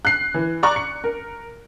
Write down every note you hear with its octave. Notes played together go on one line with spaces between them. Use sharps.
F#6 C7
E3
D5 A#5 C#6 D6 F#6
C#7
A#4